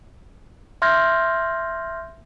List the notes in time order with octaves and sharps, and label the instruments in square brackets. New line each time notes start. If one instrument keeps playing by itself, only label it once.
[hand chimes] E5 C6 F6 G6 G#6 A#6